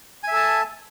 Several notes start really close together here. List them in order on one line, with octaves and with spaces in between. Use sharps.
G#5 E5 A4 A5